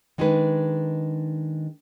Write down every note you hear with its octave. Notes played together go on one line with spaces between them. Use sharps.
D#3 G#3 D4 D#4 G#4 B4